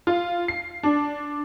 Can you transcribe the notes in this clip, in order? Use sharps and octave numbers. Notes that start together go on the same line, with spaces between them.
F4
C7
D4